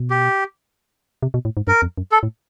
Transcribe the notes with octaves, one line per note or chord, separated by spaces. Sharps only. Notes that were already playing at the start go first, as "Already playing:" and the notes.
Already playing: B2
G4
C3
B2
A2
G#2
G2 A#4
F2
F#2
A4
A2